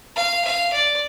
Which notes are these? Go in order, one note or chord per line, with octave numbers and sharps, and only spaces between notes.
F5
F5
D5